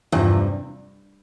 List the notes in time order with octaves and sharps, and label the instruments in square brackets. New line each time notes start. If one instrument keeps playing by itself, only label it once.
[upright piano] E2 C3 F3 C4 [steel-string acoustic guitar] G2